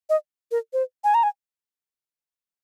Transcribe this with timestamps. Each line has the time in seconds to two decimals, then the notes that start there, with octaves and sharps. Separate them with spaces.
0.09 D#5
0.51 A#4
0.73 C5
1.04 G#5
1.14 A#5
1.23 G#5